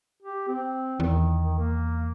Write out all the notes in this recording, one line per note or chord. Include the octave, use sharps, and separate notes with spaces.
G4
C4
E2 D#3
A#3